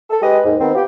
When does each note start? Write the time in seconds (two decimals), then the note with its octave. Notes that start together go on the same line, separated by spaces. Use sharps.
0.10 A4
0.22 G#3 G4 B4 D#5
0.44 D#2 G#2
0.60 D#3 B3 C4
0.74 B3 F4 G4